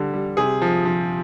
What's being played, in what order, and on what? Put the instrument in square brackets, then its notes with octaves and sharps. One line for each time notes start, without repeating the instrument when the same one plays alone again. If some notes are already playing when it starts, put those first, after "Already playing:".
Already playing: [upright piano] D3 G3
G3
C3 G#4
F3
F3